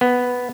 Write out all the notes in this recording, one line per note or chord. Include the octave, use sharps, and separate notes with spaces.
B3